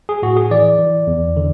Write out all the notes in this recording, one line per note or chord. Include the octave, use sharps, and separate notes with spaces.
G#4
A2 F#4
G#4
E3 D5
E3
E2
D3